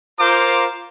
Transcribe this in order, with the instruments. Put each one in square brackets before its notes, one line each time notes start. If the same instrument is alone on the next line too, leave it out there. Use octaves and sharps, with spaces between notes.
[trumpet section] F4 A#4 C5 A#5 D6